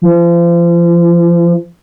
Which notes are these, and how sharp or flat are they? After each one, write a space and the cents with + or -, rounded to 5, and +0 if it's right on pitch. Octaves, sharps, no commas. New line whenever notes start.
F3 -35